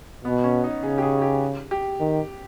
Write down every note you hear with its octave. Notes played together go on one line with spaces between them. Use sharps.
B2 B3
C#4
D#4
C#3 G#4
G4
G#4
G4
G4
D#3